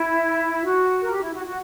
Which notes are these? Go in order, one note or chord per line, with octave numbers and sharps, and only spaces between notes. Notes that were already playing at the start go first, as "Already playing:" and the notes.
Already playing: E4
F#4
A#4
G4
E4
F#4
F#4